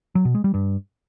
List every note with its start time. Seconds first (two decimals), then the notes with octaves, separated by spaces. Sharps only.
0.15 F#3
0.25 B2
0.35 G#3
0.44 G3
0.54 G2